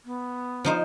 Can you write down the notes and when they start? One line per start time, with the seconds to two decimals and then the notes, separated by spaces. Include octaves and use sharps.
0.05 B3
0.65 F3 D#4 C5